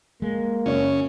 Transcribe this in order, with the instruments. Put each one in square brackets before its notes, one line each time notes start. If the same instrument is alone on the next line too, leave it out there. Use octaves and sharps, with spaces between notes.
[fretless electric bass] G#3 [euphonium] A#3
[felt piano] F#2 C#5 [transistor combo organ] C#3 C#4